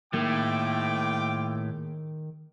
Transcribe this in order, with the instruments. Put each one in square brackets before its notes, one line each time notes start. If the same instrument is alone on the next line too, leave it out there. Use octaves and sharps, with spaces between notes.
[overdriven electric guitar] A2 [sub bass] D#3 [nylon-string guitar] G#3 A#3 D#4 [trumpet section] F4 G5 D6